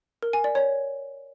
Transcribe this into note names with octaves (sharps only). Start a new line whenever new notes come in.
A#4
G#5
D5
C#5